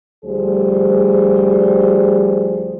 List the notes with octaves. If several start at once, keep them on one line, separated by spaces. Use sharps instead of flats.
D2 F3 G3 G#4 C5